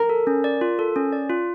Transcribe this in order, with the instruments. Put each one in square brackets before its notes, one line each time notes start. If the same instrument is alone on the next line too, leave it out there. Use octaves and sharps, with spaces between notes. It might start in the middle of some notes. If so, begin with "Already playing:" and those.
Already playing: [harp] A#4
[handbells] A4
C#4
D5
F4
A4
C#4
D5
F4